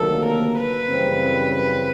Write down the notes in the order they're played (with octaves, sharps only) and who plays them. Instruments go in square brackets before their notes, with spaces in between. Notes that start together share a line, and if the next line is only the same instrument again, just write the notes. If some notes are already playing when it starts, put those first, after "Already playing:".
Already playing: [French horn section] D2 C3 D#3 F#3 A#3 [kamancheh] A4
[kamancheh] A#4
B4
[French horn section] F#2 C#3 E3 G3 C4
[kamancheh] B4